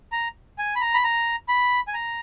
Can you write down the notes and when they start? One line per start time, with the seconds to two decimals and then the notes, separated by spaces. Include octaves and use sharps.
0.12 A#5
0.58 G#5
0.76 B5
0.81 A#5
0.94 B5
1.04 A#5
1.49 B5
1.88 G#5
1.94 A#5